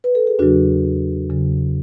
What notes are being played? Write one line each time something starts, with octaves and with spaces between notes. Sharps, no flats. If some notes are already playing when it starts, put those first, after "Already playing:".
B4
A4
G#4
E2 C#3 F#3 D4 F#4
E2 C#3 F#3